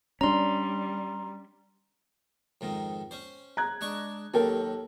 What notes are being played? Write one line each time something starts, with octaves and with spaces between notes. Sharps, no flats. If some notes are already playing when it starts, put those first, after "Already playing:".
G3 C#4 D4 A#5 C6
F2 G#2 D#3
C#4 C5
A#5 F#6 G#6
G#3 D4 C#6
D#2 F#3 G4 A4 A#4 G5